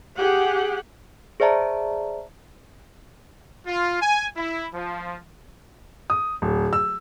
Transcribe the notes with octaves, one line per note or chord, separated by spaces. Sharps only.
G4 G#4 F#5
G#4 C5 D5 E5 A5 A#5
F4
G#5
E4
F3
D#6
D1
E6